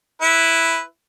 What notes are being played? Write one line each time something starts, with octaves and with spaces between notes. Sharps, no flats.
E4 B4